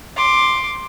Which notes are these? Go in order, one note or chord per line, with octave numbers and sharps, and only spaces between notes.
C6 D6